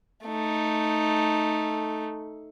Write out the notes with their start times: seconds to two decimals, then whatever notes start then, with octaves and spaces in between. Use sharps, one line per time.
0.25 A3 D#4